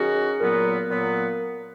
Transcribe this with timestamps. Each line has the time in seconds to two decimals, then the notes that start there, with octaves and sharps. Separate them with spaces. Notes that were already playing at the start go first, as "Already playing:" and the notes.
Already playing: D#3 F#3 C#4 F#4 G#4
0.40 A#2 F#3 B3 A#4
0.89 A#2 F#3 B3